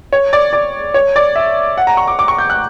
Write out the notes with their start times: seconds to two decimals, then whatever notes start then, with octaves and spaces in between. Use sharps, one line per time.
0.13 C#5
0.33 D5
0.53 D5
0.94 C#5
1.16 D5
1.36 E5
1.78 F#5
1.87 A#5
1.97 C#6
2.07 D6
2.19 D6
2.28 C#6
2.38 G6
2.50 F#6